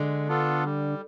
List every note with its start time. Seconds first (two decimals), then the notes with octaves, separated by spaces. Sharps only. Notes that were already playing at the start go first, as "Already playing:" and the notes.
Already playing: D3 G#3
0.28 B3 D4 F4 A4
0.65 G3